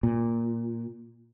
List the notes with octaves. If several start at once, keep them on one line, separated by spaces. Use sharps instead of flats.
A#2